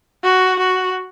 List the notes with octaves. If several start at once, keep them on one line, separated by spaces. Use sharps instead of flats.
F#4
F#4